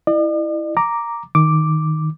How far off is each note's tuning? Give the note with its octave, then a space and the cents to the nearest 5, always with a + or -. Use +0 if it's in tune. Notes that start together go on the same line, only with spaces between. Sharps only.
E4 +0 D5 +45
A#5 +0 D6 +0
D#3 +0 D6 +0